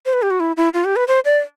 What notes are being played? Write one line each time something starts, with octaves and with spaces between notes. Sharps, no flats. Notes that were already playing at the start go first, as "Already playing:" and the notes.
C5
B4
G4
F#4
E4
E4
F4
G4
B4
C5
D5